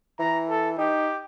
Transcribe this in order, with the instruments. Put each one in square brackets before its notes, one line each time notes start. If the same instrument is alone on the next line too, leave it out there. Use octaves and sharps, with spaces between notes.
[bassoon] E3 [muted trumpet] A#5
[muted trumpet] A4
[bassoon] D#4 [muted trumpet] G4